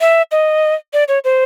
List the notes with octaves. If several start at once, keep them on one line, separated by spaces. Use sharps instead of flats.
E5
D#5
D5
C#5
C5